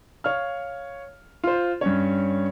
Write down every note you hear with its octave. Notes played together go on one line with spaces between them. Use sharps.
C#5 F5 F6
F4 C5
G2 C#4 C#5